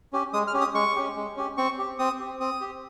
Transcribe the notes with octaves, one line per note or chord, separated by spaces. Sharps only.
C#4 G4
G#3 D#6
F6
C#4 G4
D#6
G#3 C#6
C#4 G4
G#3
C#4 G4
C4 C#6
G4
C4 D#6
G4
C4 D#6
G4